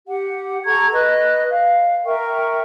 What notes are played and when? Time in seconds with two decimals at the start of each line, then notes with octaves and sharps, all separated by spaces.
0.07 G4 F#5
0.66 A4 A#5 C#6 G#6
0.92 B4 D#5 F#6
1.51 F5
2.06 A#4 E5 G5 C#6